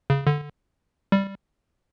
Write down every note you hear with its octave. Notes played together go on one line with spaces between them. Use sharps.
C#3
D3
G3